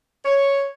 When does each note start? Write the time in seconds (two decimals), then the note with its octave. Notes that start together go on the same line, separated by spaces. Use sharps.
0.25 C#5